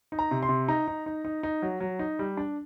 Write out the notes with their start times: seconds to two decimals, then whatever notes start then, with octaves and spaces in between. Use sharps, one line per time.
0.12 D#4
0.19 A#5
0.31 C3
0.42 C6
0.49 C3
0.68 D#4 A#5
0.88 D#4
1.06 D#4
1.25 D#4
1.43 D#4
1.62 F#3
1.80 F#3
1.99 D#4
2.19 G3
2.37 D4